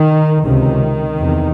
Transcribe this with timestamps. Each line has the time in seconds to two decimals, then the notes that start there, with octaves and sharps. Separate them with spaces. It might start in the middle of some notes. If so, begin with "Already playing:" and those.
Already playing: D#3
0.45 C#2 C3 D#3
1.20 E2 C3